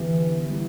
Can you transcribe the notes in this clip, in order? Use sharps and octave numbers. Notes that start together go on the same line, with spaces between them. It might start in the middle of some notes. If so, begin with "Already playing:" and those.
Already playing: D2 D3 E3 B3 G4
G3 B3 E4